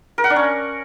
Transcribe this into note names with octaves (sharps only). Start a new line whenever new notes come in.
A#4
F#5
D4
C#4